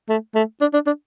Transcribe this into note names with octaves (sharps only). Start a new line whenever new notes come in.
A3
A3
D4
D4
D4